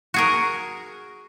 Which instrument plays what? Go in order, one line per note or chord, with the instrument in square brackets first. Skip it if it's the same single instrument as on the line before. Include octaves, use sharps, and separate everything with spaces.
[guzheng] F#4 G#4 A#4